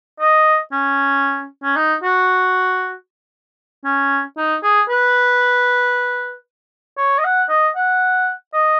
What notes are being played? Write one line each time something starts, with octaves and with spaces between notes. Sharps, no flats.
D#5
C#4
C#4
D#4
F#4
C#4
D#4
G#4
B4
C#5
D#5
F#5
D#5
F#5
D#5